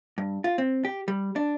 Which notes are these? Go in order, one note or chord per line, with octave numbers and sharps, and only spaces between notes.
G2
F4
C4
G4
G3
D4